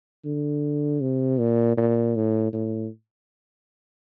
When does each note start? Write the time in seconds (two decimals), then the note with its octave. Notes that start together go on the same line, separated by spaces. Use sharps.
0.25 D3
1.01 C3
1.39 A#2
1.77 A#2
2.16 A2
2.53 A2